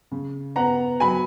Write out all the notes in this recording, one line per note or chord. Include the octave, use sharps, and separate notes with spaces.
C#3
B3 F#5 A#5
F#3 G#5 B5